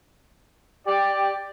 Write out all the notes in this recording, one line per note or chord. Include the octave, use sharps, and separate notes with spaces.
G4 D5